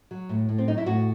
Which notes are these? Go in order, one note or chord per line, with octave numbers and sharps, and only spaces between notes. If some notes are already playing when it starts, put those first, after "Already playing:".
F#3
A2
A2
C4
F#3 D#4
E4
A2 F#4